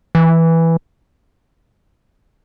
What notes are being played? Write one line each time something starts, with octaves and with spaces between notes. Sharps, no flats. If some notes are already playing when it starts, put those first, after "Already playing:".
E3